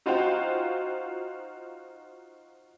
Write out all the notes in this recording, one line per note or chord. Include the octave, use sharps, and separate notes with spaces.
D#4 F4 F#4 C5 F5 G5